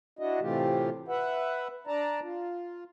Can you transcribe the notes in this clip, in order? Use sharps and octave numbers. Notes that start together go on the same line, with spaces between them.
D4 E4 F#4 D#5
A2 C3 E3 A3 F4 G4
B4 E5 F#5
D4 D5 A5 A#5
F4